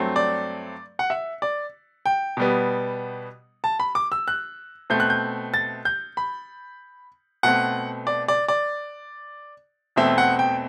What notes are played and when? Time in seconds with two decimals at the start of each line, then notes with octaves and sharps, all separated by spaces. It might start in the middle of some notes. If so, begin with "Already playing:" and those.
Already playing: G2 F#3 A3 C4
0.16 D5
0.99 F#5
1.10 E5
1.42 D5
2.06 G5
2.37 B2 G3 B3
3.64 A5
3.80 B5
3.95 D6
4.12 E6
4.28 F#6
4.90 B2 A3 C4 G6
5.00 F#6
5.10 G6
5.54 A6
5.85 G6
6.17 B5
7.43 B2 A3 C4 F#5
8.07 D5
8.28 D5
8.48 D5
9.96 E2 B2 A3 C4 E5
10.18 F#5
10.39 G5